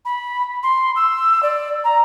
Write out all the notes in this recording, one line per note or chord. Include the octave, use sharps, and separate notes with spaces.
B5
C6
E6
D5
A#5